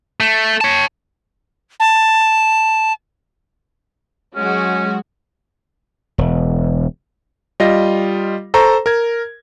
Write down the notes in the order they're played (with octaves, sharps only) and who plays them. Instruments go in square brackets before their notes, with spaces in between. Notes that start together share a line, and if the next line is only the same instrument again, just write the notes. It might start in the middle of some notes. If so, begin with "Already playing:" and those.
[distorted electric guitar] A3
C#5 A5
[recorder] A5
[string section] F#3 G#3 F#4 [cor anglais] C#4
[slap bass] E1
[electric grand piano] G3 F4 D#5 A#6
A4 C5 A#5 C#6
A#4 G#6